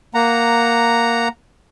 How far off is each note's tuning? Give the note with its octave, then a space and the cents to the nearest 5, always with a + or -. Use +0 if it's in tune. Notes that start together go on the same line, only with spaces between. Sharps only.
A#3 +0 F#5 +0 A#5 -5